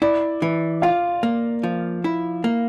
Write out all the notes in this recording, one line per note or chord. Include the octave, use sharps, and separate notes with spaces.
E4 D5
E3
F4 F5
A#3
F3
E4
A#3